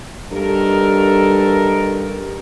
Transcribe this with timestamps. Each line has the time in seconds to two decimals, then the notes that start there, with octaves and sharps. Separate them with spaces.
0.31 G2 D#3 A4 A#4